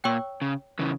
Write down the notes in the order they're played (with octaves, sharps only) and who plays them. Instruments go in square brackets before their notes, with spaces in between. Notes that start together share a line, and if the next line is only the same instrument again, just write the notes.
[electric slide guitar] A#2 [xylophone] C#5 G5 C#6 E6
[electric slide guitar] C#3
C#3 E3